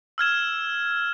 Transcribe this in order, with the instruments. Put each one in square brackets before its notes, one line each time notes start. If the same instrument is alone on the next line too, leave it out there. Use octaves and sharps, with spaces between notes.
[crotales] E6 F6 G#6 E7